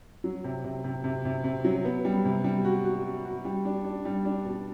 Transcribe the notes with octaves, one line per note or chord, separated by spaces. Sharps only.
F#3
C3
C3
C3
C3
C3
C3
F#3
B3
G3
C3
G3
F#4
F#4
F#4
F#4
G3
D4
D4
G3
D4
B2